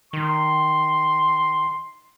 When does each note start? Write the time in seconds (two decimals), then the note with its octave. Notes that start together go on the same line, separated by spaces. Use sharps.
0.13 D#3 C6